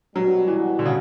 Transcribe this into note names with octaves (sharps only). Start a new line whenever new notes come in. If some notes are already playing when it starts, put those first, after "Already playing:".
B2 F#3 G3 B3 F#4
E3
D3
C#3